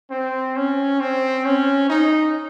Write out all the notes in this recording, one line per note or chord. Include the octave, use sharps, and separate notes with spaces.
C4
C#4
C4
C#4
D#4